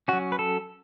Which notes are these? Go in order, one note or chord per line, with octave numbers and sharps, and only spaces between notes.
F#3 C#4 F#4
B4
A4